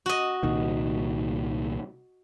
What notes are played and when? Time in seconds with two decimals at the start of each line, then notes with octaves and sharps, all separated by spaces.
0.06 F#4 D#5
0.43 C2 A#2 D#3